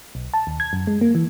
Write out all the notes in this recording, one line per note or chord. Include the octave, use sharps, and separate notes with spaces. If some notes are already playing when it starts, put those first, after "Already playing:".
B1
A5
D#2
G#6
F#2
G#3
A#3
E3